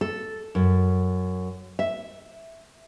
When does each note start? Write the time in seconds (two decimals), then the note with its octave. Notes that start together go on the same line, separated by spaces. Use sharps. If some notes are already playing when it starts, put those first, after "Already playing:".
0.01 A4
0.55 F#2
1.79 E5